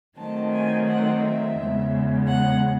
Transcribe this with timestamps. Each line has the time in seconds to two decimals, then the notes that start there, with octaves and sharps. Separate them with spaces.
0.17 D#3 F#3 A3 C4 D#4 A5
0.52 G#5
0.87 F#5
1.21 E5
1.57 E2 C#3 G#3
2.27 F#5